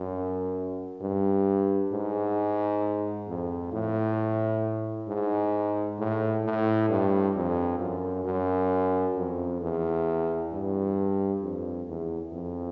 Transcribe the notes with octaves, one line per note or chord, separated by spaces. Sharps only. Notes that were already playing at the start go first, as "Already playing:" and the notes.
Already playing: F#2
G2
G#2
F2
A2
G#2
A2
A2
G2
F2
F#2
F#2
F2
E2
G2
F2
E2
F2